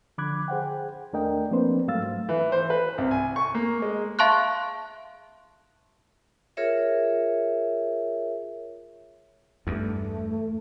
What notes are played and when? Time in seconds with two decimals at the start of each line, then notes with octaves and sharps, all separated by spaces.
0.18 D3 F3 B5 D6 F#6 G#6
0.48 G#4 C5 F#5 G5
1.13 D#2 A3 D4 A#4 D#5 G5
1.51 F3 A#3 C4 D4 B4 C5
1.88 G#2 F#3 A3 F5 E6 A6
2.29 E3
2.52 C5
2.70 B4
2.98 C2
3.11 G#5
3.36 C#6
3.55 A#3
3.82 G#3
4.19 E5 F5 A5 C6 C#6 F#6
6.57 F4 G#4 A#4 C#5 E5
9.67 E2 G2 A3